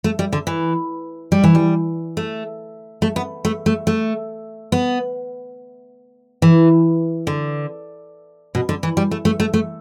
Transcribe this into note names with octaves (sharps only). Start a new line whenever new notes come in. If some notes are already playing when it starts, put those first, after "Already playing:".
A3
G3
D3
E3
G3
E3
G3
A3
A3
B3
A3
A3
A3
B3
E3
D3
B2
D3
E3
G3
A3
A3
A3
A3